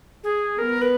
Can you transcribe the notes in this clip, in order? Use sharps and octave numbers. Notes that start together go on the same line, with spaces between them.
G#4
B3 A#4
B4